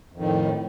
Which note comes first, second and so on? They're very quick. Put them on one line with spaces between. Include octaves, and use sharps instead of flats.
F2 D#3 A2